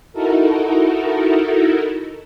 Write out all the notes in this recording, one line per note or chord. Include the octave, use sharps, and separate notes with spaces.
D#4 E4 F#4 A4 A#4